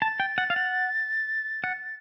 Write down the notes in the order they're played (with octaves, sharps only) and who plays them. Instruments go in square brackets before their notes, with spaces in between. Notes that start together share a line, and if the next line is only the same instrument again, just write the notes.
[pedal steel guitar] A5 [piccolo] A6
[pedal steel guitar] G5
F#5
F5
F#5
F#5